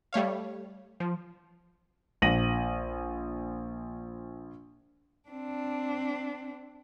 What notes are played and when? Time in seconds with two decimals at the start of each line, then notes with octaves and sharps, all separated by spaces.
0.13 G3 A3 C#5 F5
1.00 F3
2.22 A#1 A#6 D#7 F#7
5.29 C4 D4